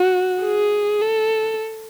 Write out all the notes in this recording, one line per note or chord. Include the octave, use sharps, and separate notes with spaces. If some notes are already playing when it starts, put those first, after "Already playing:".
Already playing: F#4
G#4
A4